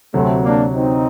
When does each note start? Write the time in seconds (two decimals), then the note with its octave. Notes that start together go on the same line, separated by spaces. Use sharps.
0.13 D2 C3 F#3 A3 C4
0.43 A#3 D4
0.73 C4 D#4